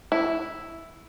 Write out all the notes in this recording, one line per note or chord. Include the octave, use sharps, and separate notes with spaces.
E4